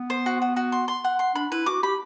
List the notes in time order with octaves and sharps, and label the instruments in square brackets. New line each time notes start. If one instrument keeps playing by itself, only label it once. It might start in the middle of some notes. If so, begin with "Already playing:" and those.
Already playing: [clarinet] B3
[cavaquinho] C5
F#4
F#4
F#4
C6
C6
F#5
C6
[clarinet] D4 [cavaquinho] B5
[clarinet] E4 [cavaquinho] B4
[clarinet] F#4 [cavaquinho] D6
[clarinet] G4 [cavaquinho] B5